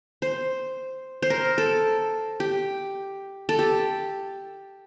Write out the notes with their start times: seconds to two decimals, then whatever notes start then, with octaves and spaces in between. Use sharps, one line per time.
0.22 C5
1.22 C5
1.30 A#4
1.58 A4
2.40 G4
3.49 A4
3.59 G4